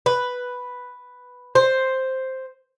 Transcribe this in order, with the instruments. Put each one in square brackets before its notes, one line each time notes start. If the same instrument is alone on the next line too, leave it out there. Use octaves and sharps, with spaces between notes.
[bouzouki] B4
C5